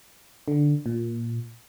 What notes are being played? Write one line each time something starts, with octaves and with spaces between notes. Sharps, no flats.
D3
A#2